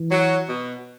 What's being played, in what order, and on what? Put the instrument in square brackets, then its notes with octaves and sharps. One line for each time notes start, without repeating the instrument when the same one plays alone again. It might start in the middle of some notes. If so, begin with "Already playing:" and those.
Already playing: [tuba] E3
[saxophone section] F#3
B2